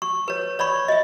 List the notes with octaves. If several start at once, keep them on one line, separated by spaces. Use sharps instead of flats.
C#6
B4 C#5
C#5 D5 B5 C#6
D#5 E5